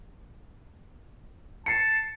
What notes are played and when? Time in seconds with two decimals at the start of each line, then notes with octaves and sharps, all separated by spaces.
1.66 A5 C7 C#7